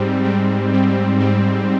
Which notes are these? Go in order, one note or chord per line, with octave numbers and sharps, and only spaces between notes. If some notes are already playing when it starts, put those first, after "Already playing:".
Already playing: G#2 G3 C4
G#2 G3 C4
G#2 G3 C4
G#2 G3 C4